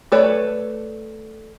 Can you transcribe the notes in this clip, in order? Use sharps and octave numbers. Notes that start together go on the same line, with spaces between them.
A3 A4 B4 C#5 D5